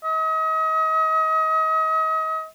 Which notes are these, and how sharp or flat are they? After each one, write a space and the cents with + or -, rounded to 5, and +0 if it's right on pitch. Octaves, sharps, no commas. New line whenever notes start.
D#5 +35